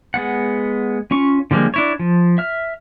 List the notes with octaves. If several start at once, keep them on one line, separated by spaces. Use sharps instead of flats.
G#3 B3 F#5
C#4 F4 C#6
D3 F3 G3 G#3 A#3
D4 E4 C#5
F3
E5 F6